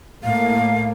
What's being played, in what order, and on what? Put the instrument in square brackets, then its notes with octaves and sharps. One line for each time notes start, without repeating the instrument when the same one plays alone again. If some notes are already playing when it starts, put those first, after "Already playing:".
[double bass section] A2 A#3 [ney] F5